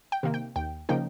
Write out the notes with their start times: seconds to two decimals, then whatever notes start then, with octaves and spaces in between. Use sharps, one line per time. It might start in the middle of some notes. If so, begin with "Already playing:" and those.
0.12 G5
0.23 C3 D#3 A#3
0.34 G5
0.56 D#2 G5
0.89 C#3 F3 A#3 D#4 G5